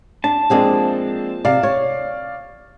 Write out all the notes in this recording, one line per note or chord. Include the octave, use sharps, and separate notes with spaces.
D4 A5
F3 G#3 A#3 C4 D4 G#4
C3 D5 F5
C#5